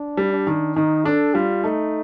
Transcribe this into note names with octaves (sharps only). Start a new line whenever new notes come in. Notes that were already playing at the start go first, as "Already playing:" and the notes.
Already playing: D4
G3
D4
D#3
D#3 D#4
D4 A4
G3 F4
A3 D#4